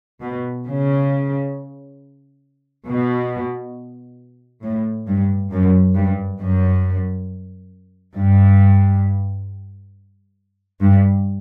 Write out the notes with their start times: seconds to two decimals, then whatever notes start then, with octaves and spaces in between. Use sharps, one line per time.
0.21 B2
0.65 C#3
2.86 B2
4.62 A2
5.07 G2
5.51 F#2
5.95 G2
6.39 F#2
8.16 G2
10.81 G2